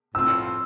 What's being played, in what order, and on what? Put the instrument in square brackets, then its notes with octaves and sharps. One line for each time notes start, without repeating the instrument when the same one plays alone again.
[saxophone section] A2 F3 C4 F4 [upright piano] E6